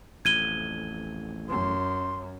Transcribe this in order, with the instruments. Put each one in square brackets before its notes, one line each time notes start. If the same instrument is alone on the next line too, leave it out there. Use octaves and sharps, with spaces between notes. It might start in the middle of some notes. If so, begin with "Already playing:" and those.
[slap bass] A1 F2 [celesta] G#6 D#7 G7
[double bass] F#2 [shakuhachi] C6